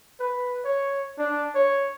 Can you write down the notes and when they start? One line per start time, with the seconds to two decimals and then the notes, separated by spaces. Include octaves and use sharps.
0.20 B4
0.65 C#5
1.18 D4
1.55 C#5